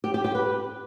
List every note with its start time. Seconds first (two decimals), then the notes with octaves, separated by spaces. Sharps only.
0.04 G4
0.14 G4
0.24 G4
0.35 B4